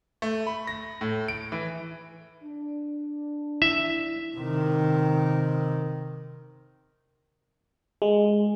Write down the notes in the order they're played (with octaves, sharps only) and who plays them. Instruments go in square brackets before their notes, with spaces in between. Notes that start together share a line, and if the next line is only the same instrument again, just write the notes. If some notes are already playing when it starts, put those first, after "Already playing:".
[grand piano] A3
B5
A#6
A2
D7
E3
[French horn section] D4
[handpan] E4 [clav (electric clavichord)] E5
[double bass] C3 D#3
[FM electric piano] G#3